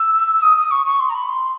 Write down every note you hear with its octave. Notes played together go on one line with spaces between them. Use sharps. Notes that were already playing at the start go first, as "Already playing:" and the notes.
Already playing: E6
D#6
D#6
C#6
C#6
C6
A#5
B5
C6